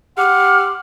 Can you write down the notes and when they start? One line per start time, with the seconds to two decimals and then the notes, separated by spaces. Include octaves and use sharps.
0.18 G4 F#5 C6 D6 F6